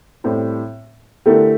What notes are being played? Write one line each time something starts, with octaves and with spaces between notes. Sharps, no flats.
A2 G3 C4 G4
D3 A3 E4 G4 A#4